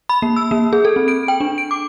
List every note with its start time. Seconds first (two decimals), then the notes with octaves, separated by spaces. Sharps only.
0.09 B5
0.22 A#3
0.36 E6
0.51 A#3
0.73 G#4
0.85 A4
0.96 C4
1.08 D7
1.28 G5
1.40 D4
1.58 D7
1.71 D6